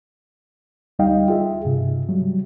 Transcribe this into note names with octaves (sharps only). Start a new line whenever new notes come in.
D2 G3 D#4 D#5 F5 G5
F4 G#4 E5
G2 C3
F#3 G3